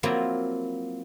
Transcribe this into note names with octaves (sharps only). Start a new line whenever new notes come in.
F3 F#3 A#3 C4 E4 F4